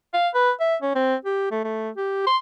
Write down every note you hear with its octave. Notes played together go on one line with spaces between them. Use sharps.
F5
B4
E5
C#4
C4
G4
A3
A3
G4
C6